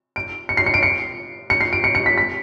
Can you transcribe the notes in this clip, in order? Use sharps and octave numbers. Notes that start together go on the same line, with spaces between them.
D7
C#7
C7
C#7
D7
C#7
C#7
C7
D7
C#7
C#7
B6
B6